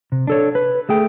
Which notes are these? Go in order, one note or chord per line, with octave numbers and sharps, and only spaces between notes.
C3
D4 A4 C#5
B4
A3 G#4 G5